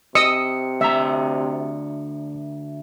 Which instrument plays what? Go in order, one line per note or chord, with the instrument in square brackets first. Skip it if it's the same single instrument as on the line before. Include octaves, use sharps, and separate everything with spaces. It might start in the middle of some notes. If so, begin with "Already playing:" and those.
[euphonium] C3 [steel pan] D#5 D#6 E6 [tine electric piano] C#7
[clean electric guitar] D2 A#5 [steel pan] E5